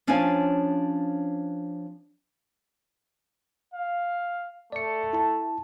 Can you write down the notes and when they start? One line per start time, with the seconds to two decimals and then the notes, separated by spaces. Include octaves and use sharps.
0.07 F3 C#4 D4 C#5 F5 G#5
3.74 F5
4.72 A3 D5 C#7
5.13 E4 A5